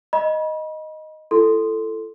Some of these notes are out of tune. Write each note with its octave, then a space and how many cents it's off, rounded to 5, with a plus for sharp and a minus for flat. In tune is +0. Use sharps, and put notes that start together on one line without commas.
D#5 +0 B5 -35
E4 +40 A4 +0 C6 -5